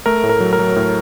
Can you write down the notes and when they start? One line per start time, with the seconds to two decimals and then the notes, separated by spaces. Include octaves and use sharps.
0.06 A3 A#4
0.23 A2
0.29 A#4
0.40 F#3
0.53 A#4
0.59 F#3
0.76 A2